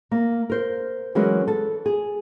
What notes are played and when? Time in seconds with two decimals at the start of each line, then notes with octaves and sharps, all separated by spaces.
0.11 A#3
0.50 A#4 C5
1.15 E3 F#3 G#3 C#4 A#4 B4
1.48 A4
1.86 G#4